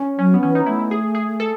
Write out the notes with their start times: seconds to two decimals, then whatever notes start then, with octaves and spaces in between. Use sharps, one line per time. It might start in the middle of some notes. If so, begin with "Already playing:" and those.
Already playing: C#4
0.18 F#3 C#4
0.34 B3
0.43 E3 C#4
0.55 D#4
0.66 A3 E4
0.79 E4
0.91 G#4
1.15 G#4
1.40 A4